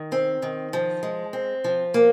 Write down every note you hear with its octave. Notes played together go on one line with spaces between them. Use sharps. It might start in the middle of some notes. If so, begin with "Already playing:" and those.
Already playing: D#3
C4
D#3
F3
G#3
C4
F3
A#3